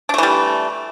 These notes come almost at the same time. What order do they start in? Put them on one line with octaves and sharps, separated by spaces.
D4 A3 E3 G3